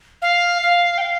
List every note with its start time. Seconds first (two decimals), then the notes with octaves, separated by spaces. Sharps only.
0.22 F5
0.62 F5
0.98 G5
1.01 F5